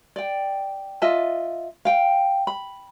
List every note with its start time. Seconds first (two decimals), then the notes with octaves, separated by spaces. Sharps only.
0.16 D5 G5
1.02 F4 D#5 E5 A5
1.85 F5 G5
2.47 B5